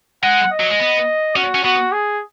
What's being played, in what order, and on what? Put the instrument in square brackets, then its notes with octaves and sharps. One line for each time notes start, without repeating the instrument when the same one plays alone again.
[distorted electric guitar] G#3 [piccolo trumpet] F#5
[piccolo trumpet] D#5
[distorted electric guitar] F#3
G#3
B3
[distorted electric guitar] C#4 [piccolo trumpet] F#4
[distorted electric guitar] C#4
[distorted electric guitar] B3 [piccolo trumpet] F#4
[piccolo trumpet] G#4